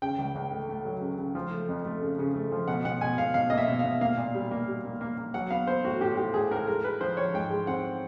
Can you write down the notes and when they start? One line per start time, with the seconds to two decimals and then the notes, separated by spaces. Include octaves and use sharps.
0.02 C#3 G5
0.19 C#2
0.35 C#2
0.51 A3
0.69 A3
0.85 F#3
1.01 C#3
1.18 C#3
1.35 F3
1.51 A3
1.69 F2
1.85 A3
2.02 C#3
2.19 C#3
2.34 A3
2.52 F3
2.68 B2 F#5
2.85 B2 F#5
3.01 B2 G#5
3.18 B2 F5
3.34 B2 F5
3.50 A#3 D#5
3.58 E5
3.68 B2
3.79 F5
3.84 B2
4.01 A#3 F5
4.18 A#2
4.34 G3
4.51 A#3
4.68 G3
4.85 A#3
5.01 A#3
5.18 A#3
5.34 F#3 F#5
5.51 B3 F5
5.67 B3 C5
5.84 A2 F#4
6.00 A2 G4
6.17 A2 G4
6.34 A2 G#4
6.51 A2 A#4
6.68 G#3 A#4
6.84 G#3 B4
7.01 F3 C5
7.17 F3 C#5
7.34 G#2 G5
7.50 G#3
7.67 C4 F#5